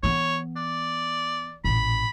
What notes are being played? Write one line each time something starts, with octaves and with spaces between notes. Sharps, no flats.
E3 B3 C#5
D5
A1 A#2 B5